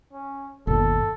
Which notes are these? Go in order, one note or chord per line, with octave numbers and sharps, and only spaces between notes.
C#4
G1 D#2 A#2 A4